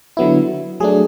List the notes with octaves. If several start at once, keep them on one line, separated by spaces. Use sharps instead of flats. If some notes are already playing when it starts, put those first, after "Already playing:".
D3 F#3 B3 E4
F#3 A3 D4 G#4